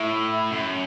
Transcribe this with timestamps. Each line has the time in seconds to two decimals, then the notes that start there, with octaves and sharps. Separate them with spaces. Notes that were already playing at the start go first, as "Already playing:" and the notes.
Already playing: A2 E4
0.51 F#2